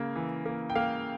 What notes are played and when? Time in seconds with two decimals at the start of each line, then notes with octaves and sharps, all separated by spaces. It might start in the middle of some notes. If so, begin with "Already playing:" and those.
Already playing: C#3 A#3
0.16 E3
0.46 A#3
0.70 G5
0.75 A#3 F5